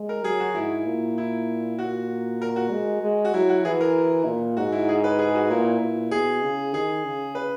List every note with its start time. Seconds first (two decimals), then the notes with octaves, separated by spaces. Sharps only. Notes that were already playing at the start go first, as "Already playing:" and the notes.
Already playing: G#3
0.09 A#4
0.24 F#3 G#4
0.40 F#4
0.55 G#2 E4
0.86 A#2
1.18 E4
1.78 A#2 F#4
2.42 A#4
2.56 F#4
2.71 G#3
3.03 G#3
3.25 F#4
3.34 F#3 E4
3.49 F#4
3.65 E3 G#4
3.81 A#4
4.26 A#2
4.57 G#2 F#4
4.72 E4
4.89 G#4
5.04 B4
5.19 G#4
5.35 F#4
5.50 A#2 E4
5.81 A#2
6.11 B2 G#4
6.42 C#3
6.74 D#3 G#4
7.05 C#3
7.35 B4